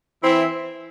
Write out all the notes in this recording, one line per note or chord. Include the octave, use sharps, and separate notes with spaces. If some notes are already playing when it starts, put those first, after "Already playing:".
E3 C4 E4